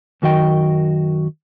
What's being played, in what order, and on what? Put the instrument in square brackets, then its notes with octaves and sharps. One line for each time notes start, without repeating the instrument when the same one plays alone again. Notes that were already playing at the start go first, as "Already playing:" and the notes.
[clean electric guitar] F#2 D#3 F#4 D#5 G5